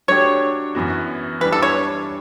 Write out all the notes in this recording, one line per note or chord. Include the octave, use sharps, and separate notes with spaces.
F#3 A3 D4 G4 C#5
F#2 E3 B3 F#4
E3 G3 D4 B4
A4
C#5